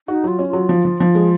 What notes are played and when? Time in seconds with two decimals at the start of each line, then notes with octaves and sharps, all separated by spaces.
0.08 D#4 F#4
0.24 F#3 F4
0.39 C#4
0.48 F4
0.53 F#3
0.69 F3
0.85 F3
1.00 F3
1.15 G#3